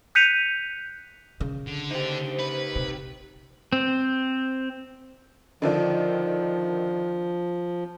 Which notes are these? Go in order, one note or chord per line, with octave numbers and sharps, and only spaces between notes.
F#6 G6 B6 C#7 D#7 F7
C#3
D3
D#4 G4 C5
B4
C3
C4
D3 D#3 F3 D4